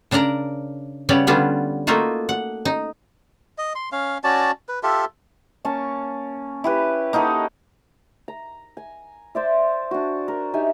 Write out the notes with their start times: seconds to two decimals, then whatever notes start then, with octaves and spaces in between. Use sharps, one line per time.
0.11 C#3 D4 A#4 D5 A#5
1.09 C#3 G3 B3 C#5 D5
1.27 D3 G3 B3 C#4 D4 F4
1.87 A3 A#3 D#4 F4 F#4
2.29 F#5
2.65 D#4
3.58 D#5
3.75 C6
3.92 C#4 F5
4.24 C#4 F#4 D5 A5
4.69 B4
4.83 F4 G4 A4 E5
5.65 A#3 C#4 A5 C#6
6.64 E4 G4 B4
7.13 A#3 D#4 F#4 A4
8.28 A#5
8.77 G#5
9.35 C5 D5 E5
9.91 D4 F#4
10.28 A#4
10.53 D#4 G4 E5 G#5